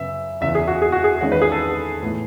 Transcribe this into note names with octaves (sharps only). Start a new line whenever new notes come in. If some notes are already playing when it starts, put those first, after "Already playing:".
Already playing: F#2 C#3 B3 E5
E2 C#3 E3 B3 E5
G#4
F#4
G#4
F#4
G#4
E2 D#3 G#3 C#4 F#5
B4
G#4
A4
A2 E3 B3